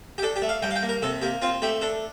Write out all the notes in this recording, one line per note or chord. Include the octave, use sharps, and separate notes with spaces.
G4
D4 A4
G4
A3
F5
G2 G5
F5
G5
A#3
A#4
C3 A4
A#3 G4
C4 F4
A3 G4
D4 A4